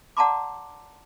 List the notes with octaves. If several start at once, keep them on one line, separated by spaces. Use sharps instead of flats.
D5 F#5 A5 A#5 C6 D6